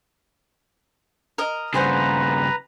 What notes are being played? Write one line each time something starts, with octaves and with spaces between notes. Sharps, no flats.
A#4 D#5
G2 C#3 G#4 B4 C5 F#5 A#5